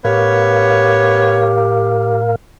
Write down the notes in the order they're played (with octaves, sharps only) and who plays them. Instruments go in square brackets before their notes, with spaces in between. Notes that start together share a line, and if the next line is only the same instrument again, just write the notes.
[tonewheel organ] A2 A#4 F5 [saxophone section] B3 C#5 [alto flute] G4